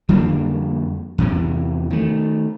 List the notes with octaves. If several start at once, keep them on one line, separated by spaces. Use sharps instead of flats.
F2 D3 G3 A#3
E2 C3 E3
D#3 A3